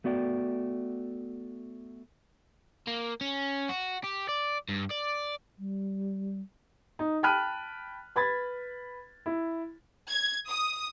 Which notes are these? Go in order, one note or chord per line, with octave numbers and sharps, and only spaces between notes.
A3 B3 F#4 D5 F#5 G5
A#3
C#4
F#4
G4
D5
G2
D5
G3
D#4
G5 A5 B5 F6 F#6 D#7
B4 B5 G#6 A6
E4
G#6
D#6